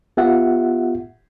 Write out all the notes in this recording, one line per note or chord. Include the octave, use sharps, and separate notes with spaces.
B3 F4 G4 E5 F#5